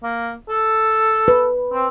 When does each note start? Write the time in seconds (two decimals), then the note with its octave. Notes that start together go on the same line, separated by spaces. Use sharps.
0.03 A#3
0.49 A4
1.28 B4
1.72 C4